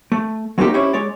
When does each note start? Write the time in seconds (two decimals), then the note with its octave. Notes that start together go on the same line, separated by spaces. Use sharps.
0.12 A3
0.58 F#3 G#3 A#3 C4 D#4 G4
0.74 C#4 E4 G4 C5 C#5
0.93 G#3 C#5 D5